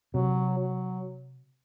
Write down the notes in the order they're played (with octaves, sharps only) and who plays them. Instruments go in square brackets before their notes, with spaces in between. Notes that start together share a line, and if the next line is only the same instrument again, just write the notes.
[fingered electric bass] C3 [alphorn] F#3
[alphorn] F#3